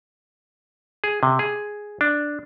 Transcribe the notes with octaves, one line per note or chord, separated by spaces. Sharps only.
G#4
C3
G#4
D4